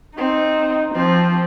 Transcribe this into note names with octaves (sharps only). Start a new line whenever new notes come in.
C4 D#4
F3 C4